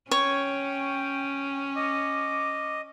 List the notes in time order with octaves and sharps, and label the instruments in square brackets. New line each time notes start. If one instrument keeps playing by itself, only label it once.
[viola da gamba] C#4 [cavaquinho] C#5 [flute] G5
[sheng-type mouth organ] D#5 [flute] D6